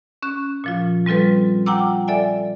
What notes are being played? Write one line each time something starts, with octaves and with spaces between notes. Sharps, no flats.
C#4 F#6
A#2 F3 F4
G3 C4 F4 A4 B4
F4 F#5 G5 A#5 D6 E6
A4 D5 E5 G#5